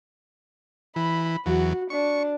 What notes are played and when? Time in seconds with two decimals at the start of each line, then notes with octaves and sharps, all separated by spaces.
0.96 E3 B5
1.46 E2 F#3 F#4
1.90 D4 C#6